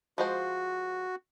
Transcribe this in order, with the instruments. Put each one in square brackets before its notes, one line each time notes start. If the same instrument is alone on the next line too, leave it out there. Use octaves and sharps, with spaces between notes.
[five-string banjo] F3 G#3 C5 [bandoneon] F#4